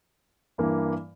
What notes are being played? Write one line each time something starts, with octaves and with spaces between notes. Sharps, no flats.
G2 E3 A#3